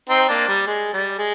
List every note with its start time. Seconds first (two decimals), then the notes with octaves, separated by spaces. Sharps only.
0.09 C4 D#4
0.28 A#3 D4
0.48 G3
0.67 G#3
0.93 G3
1.18 G#3